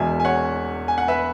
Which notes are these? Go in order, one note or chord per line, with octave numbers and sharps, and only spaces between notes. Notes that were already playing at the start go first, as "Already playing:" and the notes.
Already playing: E1 E2 B2 G#3 E5 G#5
G#5
C#5 F#5
G#5
F#5
B4 E5